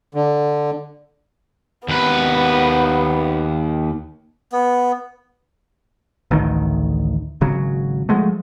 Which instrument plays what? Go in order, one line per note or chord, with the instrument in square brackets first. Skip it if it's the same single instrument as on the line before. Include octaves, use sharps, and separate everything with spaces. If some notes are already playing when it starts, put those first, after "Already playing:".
[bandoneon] D3
[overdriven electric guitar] D#2 B4 [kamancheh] B3
[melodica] B3
[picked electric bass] A1 D2 D#3
G#1 C#3 F#3
F3 F#3 G#3 A3